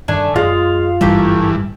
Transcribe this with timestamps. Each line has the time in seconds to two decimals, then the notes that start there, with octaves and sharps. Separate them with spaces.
0.08 G2 D#3 A3 D4 G#5
0.36 F#2 G#3 F4 F5
1.01 G#1 G2 E3 G3 A3 A#3 G4